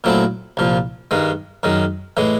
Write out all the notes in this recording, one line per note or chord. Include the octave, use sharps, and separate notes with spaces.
A#2 F#3 A3 C4 E4
C2 A#2 F3
G2 D#3 G#3
F#2 D#3 G#3
A2 E3 G#3